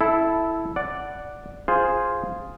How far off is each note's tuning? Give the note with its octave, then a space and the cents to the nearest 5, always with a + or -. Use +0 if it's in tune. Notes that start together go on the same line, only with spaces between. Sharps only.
E4 +0 A4 -15
D5 +0 F#5 +0
F4 +0 G#4 +0 C5 +0